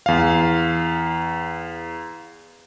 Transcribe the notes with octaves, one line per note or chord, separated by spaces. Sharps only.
E2 F5